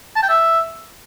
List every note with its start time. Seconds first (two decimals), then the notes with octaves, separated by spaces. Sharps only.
0.16 A5
0.23 G5
0.29 E5